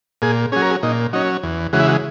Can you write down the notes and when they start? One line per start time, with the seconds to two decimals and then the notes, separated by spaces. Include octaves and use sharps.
0.22 A#2 G#4
0.52 F#3 C#4 G#4
0.62 A#4
0.71 G#4
0.83 A#2 D#4
1.13 F#3 C#4 D#4
1.43 E2
1.73 C#3 E3 G#3 F#4
1.80 E4
1.87 F#4